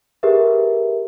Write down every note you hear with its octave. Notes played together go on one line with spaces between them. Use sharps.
G4 G#4 A#4 B4 E5